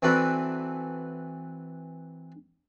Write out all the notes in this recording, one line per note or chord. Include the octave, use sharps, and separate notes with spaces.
E3 C4 F#4 A4 B4 D5